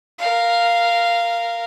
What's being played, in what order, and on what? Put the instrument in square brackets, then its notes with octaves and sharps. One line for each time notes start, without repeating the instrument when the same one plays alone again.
[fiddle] A#4 F5